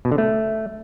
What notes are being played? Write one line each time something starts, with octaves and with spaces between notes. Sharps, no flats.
B2
D3
A3